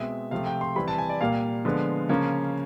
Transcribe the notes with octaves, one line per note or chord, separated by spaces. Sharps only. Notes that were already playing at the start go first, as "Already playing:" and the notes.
Already playing: B2 G#3 C4 E5
C3 F3 A3 F5
G5
C6
E3 G3 C4 B5
A5
G#5
D5
A#2 G3 A#3 F5
D3 F3 G#3 B3
C#3 F3 A#3 C#4